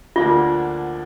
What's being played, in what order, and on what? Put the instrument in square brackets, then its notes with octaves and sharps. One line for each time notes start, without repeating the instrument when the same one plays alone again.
[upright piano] D2 D3 F3 A#3 D4 [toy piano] F4